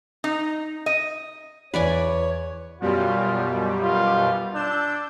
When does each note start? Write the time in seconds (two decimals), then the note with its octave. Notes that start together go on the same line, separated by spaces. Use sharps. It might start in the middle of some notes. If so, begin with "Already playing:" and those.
0.24 D#4
0.86 D#5
1.74 E2 B4 C#5 D5 G#5
2.81 F#2 B2 G3 F4
3.82 F4
4.54 D4 E6 G6